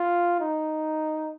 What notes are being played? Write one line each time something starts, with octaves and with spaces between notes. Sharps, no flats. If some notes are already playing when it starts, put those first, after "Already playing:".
Already playing: F4
D#4